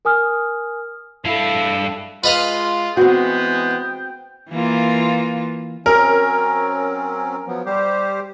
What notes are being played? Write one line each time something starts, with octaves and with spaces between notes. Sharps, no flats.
A#4 G#5 D#6 F6
G2 E4 A4 F5
G#3 F4 B4 D#5 F5
E3 G#3 B3 C4 F#4 G5
E3 A#3 F4
F#3 C4 C#4 A#4
F3 F#3 B3
G3 G4 C5